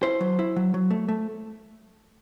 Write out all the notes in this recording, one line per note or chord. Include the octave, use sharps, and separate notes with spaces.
E4 C5
F#3
E4
F#3
F#3
A3
A3